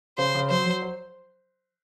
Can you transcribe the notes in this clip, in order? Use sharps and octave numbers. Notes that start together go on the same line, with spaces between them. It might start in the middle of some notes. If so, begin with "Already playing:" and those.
C#3 C5
C#3
F#3 C5
F#3
C5